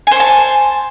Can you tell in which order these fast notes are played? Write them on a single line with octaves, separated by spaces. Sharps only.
G#5 C5 C#6 A5